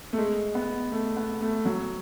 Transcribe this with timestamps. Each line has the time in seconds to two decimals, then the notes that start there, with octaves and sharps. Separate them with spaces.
0.13 A3
0.18 G#3
0.55 B3
0.92 A3
1.17 B3
1.41 A3
1.65 F#3